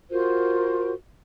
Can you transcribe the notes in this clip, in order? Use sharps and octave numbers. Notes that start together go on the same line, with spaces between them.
F4 F#4 A#4 C5